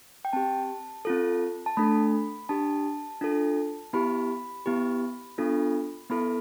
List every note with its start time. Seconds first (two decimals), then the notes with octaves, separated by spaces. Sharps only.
0.25 G5
0.33 C4 G4 A5
1.05 C4 F4 A4
1.66 A5
1.77 A3 D4 A4 B5
2.49 D4 G4 A5
3.21 D4 F4 A4
3.93 B3 E4 G4 B5
4.66 B3 E4 G4
5.38 B3 D4 F4 A4
6.10 B3 E4 A4 B5